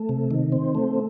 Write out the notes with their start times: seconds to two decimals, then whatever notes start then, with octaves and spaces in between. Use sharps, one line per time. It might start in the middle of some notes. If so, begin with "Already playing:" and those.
Already playing: A3
0.09 C3
0.31 D#3
0.52 C4
0.75 A3